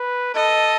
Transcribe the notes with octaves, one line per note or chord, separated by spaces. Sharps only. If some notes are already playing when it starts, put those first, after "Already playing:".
Already playing: B4
A4 D#5